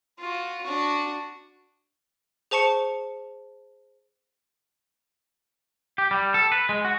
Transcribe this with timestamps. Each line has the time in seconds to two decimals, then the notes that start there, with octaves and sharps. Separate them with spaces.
0.18 F4 F#4
0.63 D4 F#4
2.51 G#4 C5 A5 C#6 C#7
5.98 G4
6.11 G3
6.34 A4
6.52 B4
6.69 G#3
6.85 F#4